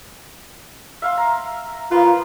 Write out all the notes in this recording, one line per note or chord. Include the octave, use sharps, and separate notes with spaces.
E5 F5 C6
A#5
F3 A#3 F4 B4